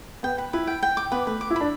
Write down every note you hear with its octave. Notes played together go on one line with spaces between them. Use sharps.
B3 G5
B4
E4 B4
G5
G5
D6
B3 B4
A3 B4
D6
E4
D4 B5